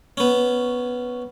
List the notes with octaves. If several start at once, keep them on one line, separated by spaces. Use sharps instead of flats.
B3 C#4